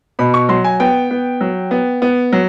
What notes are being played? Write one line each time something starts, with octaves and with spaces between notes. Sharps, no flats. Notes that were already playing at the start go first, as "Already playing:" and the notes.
B2 B5
C#6
F#3 C6
G#5
B3 G5
B3
F#3
B3
B3
F#3